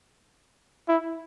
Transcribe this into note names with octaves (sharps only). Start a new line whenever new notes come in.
E4